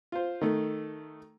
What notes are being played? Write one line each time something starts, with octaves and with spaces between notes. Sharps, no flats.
F4 C5
D#3 A3